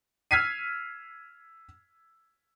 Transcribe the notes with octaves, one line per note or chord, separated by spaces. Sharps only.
E6 F6 G#6 B6 C7 D#7